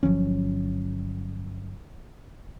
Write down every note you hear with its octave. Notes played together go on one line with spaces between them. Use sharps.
G1 F3 F#3 C#4